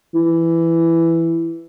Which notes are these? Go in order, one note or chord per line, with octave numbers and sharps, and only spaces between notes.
E3